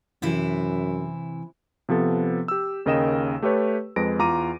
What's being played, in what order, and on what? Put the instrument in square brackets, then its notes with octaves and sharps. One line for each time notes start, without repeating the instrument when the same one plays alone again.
[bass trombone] F#2 [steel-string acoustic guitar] C3 E3 E4
[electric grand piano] C3 F3 B3 A4
G4 E6
D#2 C#3 A#4 D#5 G5 E7
A3 G4 A4 B4 C#5
F2 G#3 B4 A#6 D7
E2 F4 A#5 D6 D#7